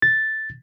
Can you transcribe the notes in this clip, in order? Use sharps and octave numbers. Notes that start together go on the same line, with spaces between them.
A6